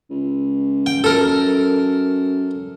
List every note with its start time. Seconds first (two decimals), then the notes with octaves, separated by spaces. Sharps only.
0.10 C#2
0.86 G5
1.04 F#2 A4 A#4